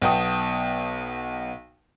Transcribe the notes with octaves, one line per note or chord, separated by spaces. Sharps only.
B1 B3 G5 A5 D#6